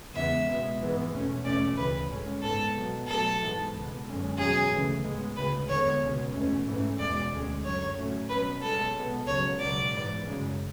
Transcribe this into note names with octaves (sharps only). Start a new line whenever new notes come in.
E2 C#3 E3 G#3 B3 E5
B2 G#3 B3
G#2 E3 G#3 B3
E2 B2 A3 C#4
E2 B2 A3 C#4 D5
D2 C#3 E3 B4
A2 G#3 C#4
G#2 G#3 B3 A4
B2 F#3 B3
B2 F#3 A3 A4
G#2 E3 G#3 B3
C#2 B2 G#3 B3
F#2 D3 G#3 C#4
E2 B2 F#3 C#4 G#4
D2 C#3 E3 A3 C#4
A2 G#3 B3
D2 C#3 G#3 B4
E2 D3 G#3 B3 C#5
C#2 B2 G#3 C#4
E2 B2 A3 C#4
G#2 E3 A3 C#4
E2 B2 G#3 D5
D2 D3 G#3 C#4
F#2 D3 F#3 C#5
A2 F#3 A3 C#4
B2 F#3 C#4 B4
B2 G#3 C#4 A4
B2 G#3 B3
C#2 C#3 F#3 C#5
C#2 B2 F#3 B3 D5
G#2 E3 B3
F#2 C#3 G#3